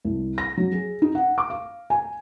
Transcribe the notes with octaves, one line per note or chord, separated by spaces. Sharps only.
C2
A#6
F#3
G#4
D#4
F#5
D6
F5
G#5